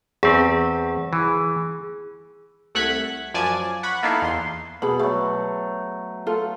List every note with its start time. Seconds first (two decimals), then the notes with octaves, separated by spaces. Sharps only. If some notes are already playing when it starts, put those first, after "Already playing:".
0.23 E2 C4 G#4
1.13 E3
2.75 C2 A3 F#5 F#6 G#6 B6
3.34 F#2 F3 D5 G#5 A5 G#6
3.83 F#5 B5 C#6
4.03 A#3 B3 D#4 E4 A4 F5
4.22 E2 C6
4.82 B2 G#4 B5
4.99 F#3 A3
6.27 F4 A4